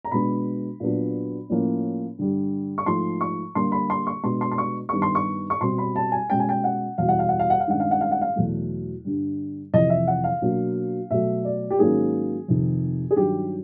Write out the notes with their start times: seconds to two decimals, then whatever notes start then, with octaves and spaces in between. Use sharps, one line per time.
0.05 A#5
0.11 B2 G#3 B3 D4 B5
0.80 A#2 F#3 B3 D4
1.49 A2 F3 A#3 C#4
2.18 G2 D3 G3
2.78 C#6
2.86 G#2 F3 A3 C6
3.21 C#6
3.55 D3 G3 A#3 C6
3.72 B5
3.90 C6
4.07 C#6
4.23 B2 G#3 B3 D4 C6
4.41 C6
4.51 C6
4.58 C#6
4.89 G2 D#3 G3 B3 C#6
5.02 C6
5.15 C#6
5.50 C#6
5.61 B2 G3 C4 C6
5.78 B5
5.96 A5
6.12 G#5
6.30 B2 G#3 C#4 G5
6.40 G#5
6.49 G5
6.64 F#5
6.98 E2 B2 G3 F5
7.08 F#5
7.19 F5
7.29 F#5
7.39 F5
7.50 F#5
7.60 F5
7.67 G2 D#3 G#3 C#4 F#5
7.80 F5
7.91 F#5
8.01 F5
8.11 F#5
8.21 F5
8.36 E2 B2 F#3 A3
9.04 G2 D3 G3
9.73 F2 C3 E3 D#5
9.90 E5
10.07 F#5
10.24 F5
10.42 B2 F#3 A#3 D4
11.11 B2 F#3 A3 E5
11.45 D5
11.70 G4
11.79 G#2 D#3 F#3 A#3 C#4 G#4
12.48 F2 C3 D#3
13.11 G#4
13.16 G2 D#3 F#3 G4